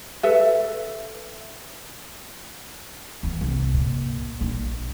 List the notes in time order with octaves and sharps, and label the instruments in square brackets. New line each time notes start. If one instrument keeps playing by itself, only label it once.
[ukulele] A4 B4 E5
[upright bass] E2
C2
A#2
A#1